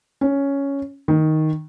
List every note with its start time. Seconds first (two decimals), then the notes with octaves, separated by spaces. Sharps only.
0.21 C#4
1.08 D#3